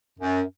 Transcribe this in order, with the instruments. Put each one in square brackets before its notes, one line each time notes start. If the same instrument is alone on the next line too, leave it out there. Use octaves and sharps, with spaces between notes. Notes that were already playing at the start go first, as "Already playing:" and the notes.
[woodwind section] F#2